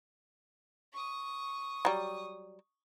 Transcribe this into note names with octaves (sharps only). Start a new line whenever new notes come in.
C#6 D#6
F#3 G3